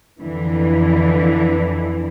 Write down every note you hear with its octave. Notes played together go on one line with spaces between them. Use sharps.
F2 D3 E3